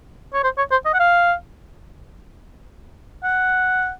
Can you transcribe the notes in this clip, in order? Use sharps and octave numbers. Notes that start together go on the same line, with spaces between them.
C#5
C5
C#5
C5
D#5
F#5
F5
F#5